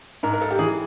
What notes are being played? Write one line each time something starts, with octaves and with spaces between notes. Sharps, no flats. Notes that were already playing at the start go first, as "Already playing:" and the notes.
G#2 A#4
A#4
A4
G4
E3 G#4